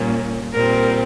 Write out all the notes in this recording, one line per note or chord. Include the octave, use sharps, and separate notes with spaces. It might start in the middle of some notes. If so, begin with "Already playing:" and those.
Already playing: A#2 G3 A#3 C#4
A#2 G3 C4 A#4